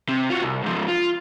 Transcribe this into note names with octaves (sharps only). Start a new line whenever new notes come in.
C3
F4 F#4
C2
G#2 F3
F4